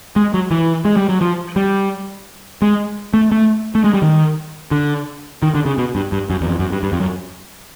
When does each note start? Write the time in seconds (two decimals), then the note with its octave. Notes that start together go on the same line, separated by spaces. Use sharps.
0.16 G#3
0.34 F#3
0.51 E3
0.85 G#3
0.96 G3
1.09 F#3
1.21 F3
1.56 G3
2.62 G#3
3.13 A3
3.31 A3
3.75 A3
3.84 G#3
3.94 G3
4.02 D#3
4.71 D3
5.42 D#3
5.54 D3
5.66 C#3
5.78 B2
5.95 G2
6.12 G2
6.30 F#2
6.41 E2
6.47 F2
6.59 F#2
6.71 G2
6.83 G2
6.92 F2
7.00 F#2